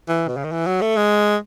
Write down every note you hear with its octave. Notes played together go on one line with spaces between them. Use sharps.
E3
B2
C#3
D#3
E3
F#3
A3
G#3